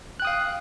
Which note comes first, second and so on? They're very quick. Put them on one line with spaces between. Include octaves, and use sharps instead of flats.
F#6 G5 D#6 F5